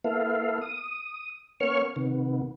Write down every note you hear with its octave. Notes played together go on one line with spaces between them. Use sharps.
A#3 B3 E4 A4 F5
D#6
A#3 B3 C#4 C#5 C#6 F6
C3 D#3 B3